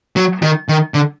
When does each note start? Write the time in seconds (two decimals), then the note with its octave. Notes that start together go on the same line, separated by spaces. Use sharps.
0.16 F#3
0.42 D#3
0.69 D#3
0.94 D3